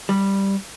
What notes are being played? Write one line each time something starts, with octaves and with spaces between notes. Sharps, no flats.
G3